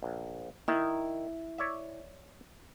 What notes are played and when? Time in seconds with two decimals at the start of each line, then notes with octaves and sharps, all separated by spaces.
0.03 A#1
0.68 D#3 E4
1.58 C#5 D5 E5